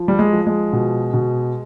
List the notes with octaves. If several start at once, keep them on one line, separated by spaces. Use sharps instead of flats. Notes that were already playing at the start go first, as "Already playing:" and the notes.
Already playing: F3
G3
G#3
F3
G#3
B2
B2